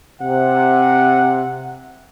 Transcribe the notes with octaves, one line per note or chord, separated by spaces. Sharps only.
C3 F#5